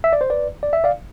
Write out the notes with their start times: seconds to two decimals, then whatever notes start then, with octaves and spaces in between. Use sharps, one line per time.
0.04 E5
0.13 D5
0.21 C5
0.30 B4 D5
0.63 D5
0.73 E5
0.84 D5 F5